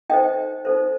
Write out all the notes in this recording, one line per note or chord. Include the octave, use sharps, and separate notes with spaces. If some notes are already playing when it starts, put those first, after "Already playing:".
D#4 A4 C5 D#5 G5
D#4 A4 C5